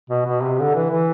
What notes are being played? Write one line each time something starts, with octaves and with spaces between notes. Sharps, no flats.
B2
B2
C3
D3
E3
E3